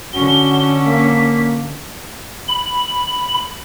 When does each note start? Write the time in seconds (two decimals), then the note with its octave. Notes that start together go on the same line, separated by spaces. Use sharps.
0.13 D3 C#4 F#4 G7
0.86 A#3 B6
2.48 B5